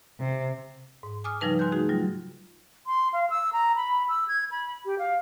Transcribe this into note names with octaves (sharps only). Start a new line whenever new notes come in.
C3
G#2
G#5 D6 D#6 F6
C#3 F3 G3 D#4 B4 A5
G#5 C6 F#6 G6
A3 D#4 F#4 G#4
F#3 G3 F4
C6
F5
E6
A#5
B5
E6
G#6
B5
G4
F5